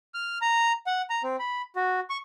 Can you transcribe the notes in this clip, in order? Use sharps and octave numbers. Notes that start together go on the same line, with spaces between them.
F6
A#5
F#5
A#5
C4
B5
F#4
C#6